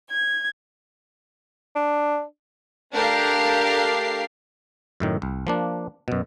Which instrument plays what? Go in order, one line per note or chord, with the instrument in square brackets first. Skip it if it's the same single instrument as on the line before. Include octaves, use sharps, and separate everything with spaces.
[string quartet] G#6
[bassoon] D4
[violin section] A3 D4 G4 A#4 F5 C7
[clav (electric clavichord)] F#2 A2 D#3
C2
F3 A#3 D4
F#2 B2